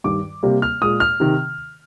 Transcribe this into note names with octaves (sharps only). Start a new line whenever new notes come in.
G2 D#3 G3 D6
C3 G3 A#3
F6
A#2 G#3 D#6
F6
C3 D#3